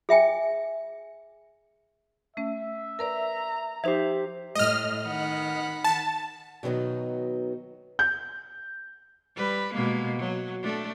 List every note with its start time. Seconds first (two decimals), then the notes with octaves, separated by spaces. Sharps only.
0.09 G#4 E5 G5 G#5
2.37 A3 C#4 E5
2.99 A#4 B4 D5 A#5
3.84 F3 D#4 G4 C5 E5
4.55 A2 D#5 F6
5.06 D#3 F#5 B5
5.84 A5
6.63 B2 D#3 F#3 B3 D#4
7.99 G6
9.36 G3 B4
9.73 B2 G#3 A#3
10.19 F#3
10.62 A3 D4